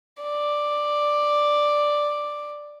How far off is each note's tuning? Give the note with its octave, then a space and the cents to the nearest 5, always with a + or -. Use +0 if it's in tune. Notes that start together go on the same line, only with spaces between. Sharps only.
D5 +5